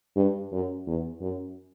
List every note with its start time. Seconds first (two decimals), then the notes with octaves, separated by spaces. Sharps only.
0.16 G2
0.52 F#2
0.87 E2
1.21 F#2